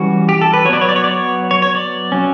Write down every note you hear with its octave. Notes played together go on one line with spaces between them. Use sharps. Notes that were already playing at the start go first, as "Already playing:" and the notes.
Already playing: E3 G3 C#4 F#4
G4
A4
B4
F#3 B3 C#5 D5
C#5
D5
C#5
D5
C#5
C#5
C#5
D5
F#3 C#4